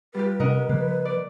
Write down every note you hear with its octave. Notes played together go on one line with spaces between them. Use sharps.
G3 F4 G4 B4
C3 C4 C#4 A#4 D#5 F#5
C#3 F3 A#3
D5